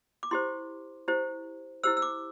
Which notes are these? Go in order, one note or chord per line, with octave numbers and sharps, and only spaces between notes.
D6
E4 G4 C5 C6
E4 G4 C5
E4 G4 C5 E6
E6
D6